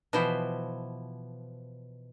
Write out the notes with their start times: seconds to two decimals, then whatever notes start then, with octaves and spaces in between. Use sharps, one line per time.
0.13 B2 E3 F3 E4 C5